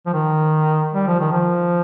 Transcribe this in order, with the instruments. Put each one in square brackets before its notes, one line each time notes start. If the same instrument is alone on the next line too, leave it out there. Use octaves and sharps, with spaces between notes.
[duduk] F3
D#3
G3
F3
D#3
F3